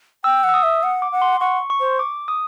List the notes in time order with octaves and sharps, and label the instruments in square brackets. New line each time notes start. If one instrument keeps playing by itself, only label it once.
[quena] G5 [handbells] E6
[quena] F#5
[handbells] E6
D#6
[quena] E5
F#5
[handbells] D6
[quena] F#5
[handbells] C6
[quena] F#5 [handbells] C#6
[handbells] C#6
[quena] C5
[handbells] D6
D#6